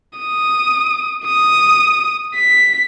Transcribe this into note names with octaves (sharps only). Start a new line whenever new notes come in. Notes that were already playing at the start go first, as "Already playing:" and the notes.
D#6
D#6
B6